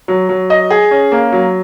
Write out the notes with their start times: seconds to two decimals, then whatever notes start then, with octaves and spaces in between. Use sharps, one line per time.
0.08 F#3
0.29 F#3
0.50 D#5
0.70 G#4
0.91 C#4
1.12 A#3
1.32 F#3